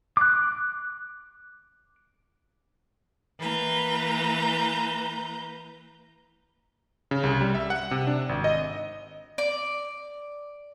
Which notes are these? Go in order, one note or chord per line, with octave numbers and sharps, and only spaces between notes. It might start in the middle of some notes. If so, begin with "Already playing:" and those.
D6 F#6
E3 A#3 B4 A#5 G6
C#3
C2
G3
E5
F#5
C3
D4
G#1
D#5
D5